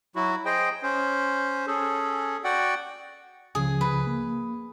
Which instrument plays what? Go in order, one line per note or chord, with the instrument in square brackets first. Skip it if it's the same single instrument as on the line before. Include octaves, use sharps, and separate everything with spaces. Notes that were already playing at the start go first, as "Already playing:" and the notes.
[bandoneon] F#3 E4 F#4
G#4 C5 D#5 G5
C#4 C5
C#4 G#4 A4
F#4 D5 F#5 G5
[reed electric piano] C#2 C#3 F3 [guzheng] G#4
[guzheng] B4
[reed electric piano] A#3